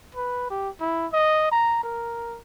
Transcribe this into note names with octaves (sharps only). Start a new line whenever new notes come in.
B4
G4
E4
D#5
A#5
A#4